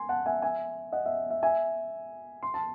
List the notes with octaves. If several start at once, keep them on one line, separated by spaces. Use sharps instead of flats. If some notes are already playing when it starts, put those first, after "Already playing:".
Already playing: G#5 C6
F#5 A5
E5 G#5
E5 G#5
D#5 F#5
E5
E5
E5 G#5
C6
A5